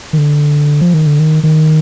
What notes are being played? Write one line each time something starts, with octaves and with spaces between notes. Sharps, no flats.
D#3
D3
F3
D#3
D3
D#3
D#3